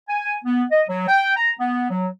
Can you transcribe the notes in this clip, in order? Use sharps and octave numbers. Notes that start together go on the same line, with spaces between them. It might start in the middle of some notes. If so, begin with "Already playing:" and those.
G#5
B3
D#5
F#3
G5
A#5
B3
F#3